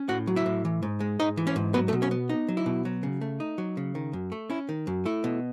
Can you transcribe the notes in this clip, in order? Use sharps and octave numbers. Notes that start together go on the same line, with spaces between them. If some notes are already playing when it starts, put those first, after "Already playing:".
Already playing: C#4
A2 F#4 F#5
F#3
E4 E5
A2
E3
G#2
G#3
G#2 D#4 D#5
E3
C#4 C#5
G#2
F#3 B3 B4
A3 A4
B2
C#4 C#5
B3
D#4
F#3
E4
B2
F#3
C#3
A3
D#4
F#3
C#3
D#3
F#2
A3
C#4 E4
D#3
F#2
A3 E4
B2